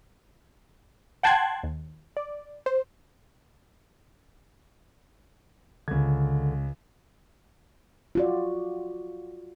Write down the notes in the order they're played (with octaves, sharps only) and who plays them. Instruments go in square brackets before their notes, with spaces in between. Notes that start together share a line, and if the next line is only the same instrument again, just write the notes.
[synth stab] F#5 G5 A5 C6 F#6 G#6
D#2
D5
C5
[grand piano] C#2 G#6 [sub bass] D3
[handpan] F4 F#4 D5